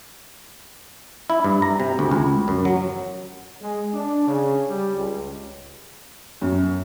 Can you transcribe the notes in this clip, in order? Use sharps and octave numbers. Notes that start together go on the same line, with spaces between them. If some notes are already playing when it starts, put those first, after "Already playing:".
E4
G2
A#5
C3
D2
C#2
F#2
F#3
G#3
D4
C#3
G3
C#2
F#2